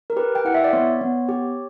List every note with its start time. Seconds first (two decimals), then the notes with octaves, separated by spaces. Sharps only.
0.10 A#4
0.16 G4 B4
0.35 G5
0.45 E4 F#5
0.54 E5
0.64 D5
0.73 B3 C#5
1.01 B3
1.29 G4